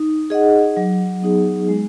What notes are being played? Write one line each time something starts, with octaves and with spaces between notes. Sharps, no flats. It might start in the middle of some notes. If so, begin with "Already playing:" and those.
Already playing: D#4
G#4 D#5 F#5
F#3
B3 D#4 G#4
G#3